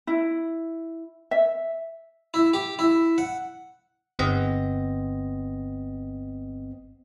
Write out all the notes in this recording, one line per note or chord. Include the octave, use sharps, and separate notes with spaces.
E4
E5
E4
G4
E4
F#5
G1 B3 C4 D#5 A#6